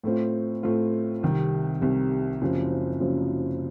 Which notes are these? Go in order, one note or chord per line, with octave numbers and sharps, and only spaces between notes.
A2 A3 C4 F4
A2 A3 C4 F4
C2 C3 D#3
C2 C3 D#3
F#1 F#2 F3 C4
F#1 F#2 F3 C4